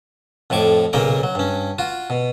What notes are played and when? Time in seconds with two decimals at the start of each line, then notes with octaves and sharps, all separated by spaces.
0.50 F2 A2 F3 C#6 D6
0.93 B1 A#2 C#3 A#3 A#4 G5
1.23 F#3
1.35 G2 C#4
1.79 F4 F#4
2.10 B2